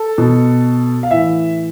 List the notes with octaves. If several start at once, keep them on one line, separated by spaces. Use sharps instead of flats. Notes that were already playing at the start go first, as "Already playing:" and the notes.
Already playing: A4
B2
F5
A2 E3 E5